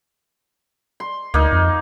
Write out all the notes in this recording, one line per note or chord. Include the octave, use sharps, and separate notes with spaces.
C6
D2 A#3 D#4
F2